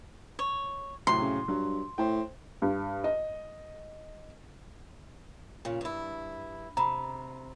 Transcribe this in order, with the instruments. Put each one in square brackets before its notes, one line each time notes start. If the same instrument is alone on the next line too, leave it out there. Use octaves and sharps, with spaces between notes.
[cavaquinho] C#5
[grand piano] A2 C3 F#3 [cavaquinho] C6
[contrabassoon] C#3
[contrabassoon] G2 [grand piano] F#3
[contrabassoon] A2 [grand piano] C5 G5
[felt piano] G2
D#5
[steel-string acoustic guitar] A#2 C#3
G2 E4
[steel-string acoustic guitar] C3 [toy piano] A#5 B5